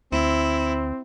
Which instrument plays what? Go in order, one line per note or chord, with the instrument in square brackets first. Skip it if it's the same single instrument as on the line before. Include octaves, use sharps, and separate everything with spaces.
[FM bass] D2 [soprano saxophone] C4 [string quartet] E4